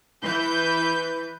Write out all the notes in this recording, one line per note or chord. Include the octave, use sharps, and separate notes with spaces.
E3 B4 G6